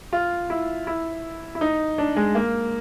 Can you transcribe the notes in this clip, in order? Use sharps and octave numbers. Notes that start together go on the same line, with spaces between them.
F4
E4
E4
E4
D#4
D4
G#3
A#3